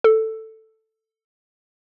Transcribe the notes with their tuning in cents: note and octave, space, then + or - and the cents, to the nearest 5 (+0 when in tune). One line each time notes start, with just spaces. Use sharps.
A4 +10